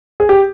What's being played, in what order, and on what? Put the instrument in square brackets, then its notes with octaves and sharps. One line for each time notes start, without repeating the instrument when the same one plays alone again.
[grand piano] G#4
G4